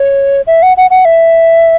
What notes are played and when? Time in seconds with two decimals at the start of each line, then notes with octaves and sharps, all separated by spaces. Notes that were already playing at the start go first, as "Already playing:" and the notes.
Already playing: C#5
0.47 E5
0.63 F#5
0.77 F#5
0.90 F#5
1.05 E5